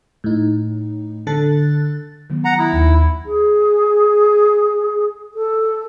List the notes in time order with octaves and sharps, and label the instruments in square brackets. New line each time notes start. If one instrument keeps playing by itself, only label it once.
[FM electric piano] A2 D#4
D3 A4 F#6 A6
[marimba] D#3 F#3 B3
[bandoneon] F#5 A#5
[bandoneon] E4 [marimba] D#6
[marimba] D#2 D#4
[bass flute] G#4
A4